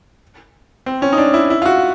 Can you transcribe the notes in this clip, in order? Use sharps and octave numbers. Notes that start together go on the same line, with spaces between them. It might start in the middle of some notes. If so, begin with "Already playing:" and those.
C4
C#4
D#4
D4
E4
E4
F4
F#4